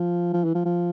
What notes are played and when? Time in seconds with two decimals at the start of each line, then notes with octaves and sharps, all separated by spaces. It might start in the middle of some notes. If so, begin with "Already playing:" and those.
Already playing: F3
0.34 F3
0.44 E3
0.54 F3
0.65 F3